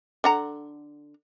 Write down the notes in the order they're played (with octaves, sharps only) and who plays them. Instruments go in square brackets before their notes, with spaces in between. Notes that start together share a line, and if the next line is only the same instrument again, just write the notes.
[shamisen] D3 F#5 A#5